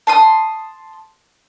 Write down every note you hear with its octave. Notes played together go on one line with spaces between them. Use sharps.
A5 C6 D#6